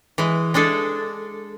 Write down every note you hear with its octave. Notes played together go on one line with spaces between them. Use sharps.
E3 G#3
G#3 D4 G#4 A4